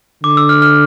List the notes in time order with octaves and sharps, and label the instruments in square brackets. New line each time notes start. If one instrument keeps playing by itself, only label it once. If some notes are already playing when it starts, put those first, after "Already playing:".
[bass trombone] D3 [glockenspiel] D6
[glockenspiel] E6
F6
F6